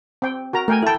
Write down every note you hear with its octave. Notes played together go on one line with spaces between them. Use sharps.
C4 G5
F#4 A#4 A#5
A3 A#4 G5 G#5
E4 A4 G5 A5